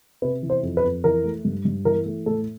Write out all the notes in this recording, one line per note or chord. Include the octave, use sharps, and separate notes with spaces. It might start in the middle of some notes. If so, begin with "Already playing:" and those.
C3 B4
E3
C5
F2
B4
F2
E3 A#4
A3
G2
G2
E3 A#4
A3
A2 A4